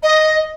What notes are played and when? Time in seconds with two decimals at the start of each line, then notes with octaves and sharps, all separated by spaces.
0.03 D#5